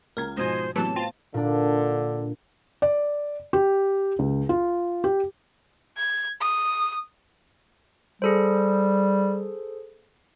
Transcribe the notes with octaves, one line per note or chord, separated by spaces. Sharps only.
C#2 A#4 G#6
G#2 B2 F3 C5 D#5 G#5
A2 C3 E3 F#3 B3 A5
C4 F4 A6
A#2 D3 D4
D5
G4
C#2
F4
G4
G#6
D#6
G3 G#4 A4 C5